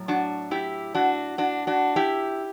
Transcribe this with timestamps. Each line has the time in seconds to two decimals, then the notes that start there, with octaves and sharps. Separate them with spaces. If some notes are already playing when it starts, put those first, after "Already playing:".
Already playing: A2 F#3
0.08 D4 F#4
0.51 E4 G4
0.94 D4 F#4
1.38 D4 F#4
1.67 D4 F#4
1.96 E4 G4